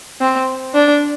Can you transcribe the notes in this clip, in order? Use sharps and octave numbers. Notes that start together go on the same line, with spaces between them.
C4
D4